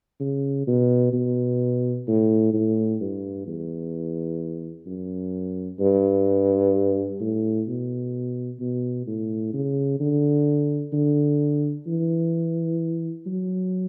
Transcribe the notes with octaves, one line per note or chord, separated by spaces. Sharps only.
C#3
B2
B2
A2
A2
G2
E2
F#2
G2
A2
B2
B2
A2
C#3
D3
D3
E3
F#3